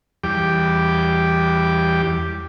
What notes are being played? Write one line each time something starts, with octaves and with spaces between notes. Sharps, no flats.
E2 G3 G4 D6